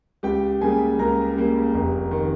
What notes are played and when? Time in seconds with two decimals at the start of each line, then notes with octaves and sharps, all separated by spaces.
0.23 C#2 G4 G5
0.60 C#3 G3 A#3 G#4 G#5
0.99 C#2 A#4 A#5
1.36 C#3 G3 A#3
1.74 F1
2.11 D#3